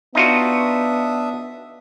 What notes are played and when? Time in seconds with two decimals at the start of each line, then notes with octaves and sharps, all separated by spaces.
0.15 B3 D4 D#4 F4 F#4 E5 D#6